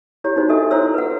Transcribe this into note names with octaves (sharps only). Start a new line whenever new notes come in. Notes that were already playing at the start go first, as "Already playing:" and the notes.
E4 G4 C#5
D#4 F#4 C5
D4 F#4 A4 D#5 E5 D#6
E4 F4 C5 C#5 C6 E6
B4 F#5